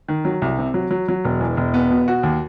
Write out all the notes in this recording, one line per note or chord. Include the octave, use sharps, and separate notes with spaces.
D#3
F#3
C2
C3
F#3
F#3
F#3
E1
E2
E1
B3
B2
F#4
D#2